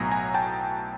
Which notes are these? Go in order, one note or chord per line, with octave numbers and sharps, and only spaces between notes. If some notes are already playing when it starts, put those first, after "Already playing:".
Already playing: B1 A2 F#3 B3 G#5 A#5
G#5 A#5
G5 A5